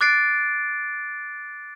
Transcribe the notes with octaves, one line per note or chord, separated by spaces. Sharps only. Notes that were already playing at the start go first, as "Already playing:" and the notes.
D6 F#6 A6 C7 D7